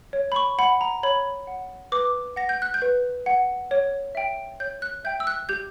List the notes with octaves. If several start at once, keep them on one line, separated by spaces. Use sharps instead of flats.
C#5
B5
C#6
F#5 B5
A#5
C#5 B5
F#5
B4 D6
F#5 A#6
G6
F#6
G6
B4
F#5
C#5
E5 G5
C#5 G6
F#6
E5 G5 G6
E6
F#6
G4 G6